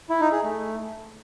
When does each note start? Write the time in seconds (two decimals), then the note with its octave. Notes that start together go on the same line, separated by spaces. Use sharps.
0.09 E4
0.21 D#4
0.32 G#4
0.43 A3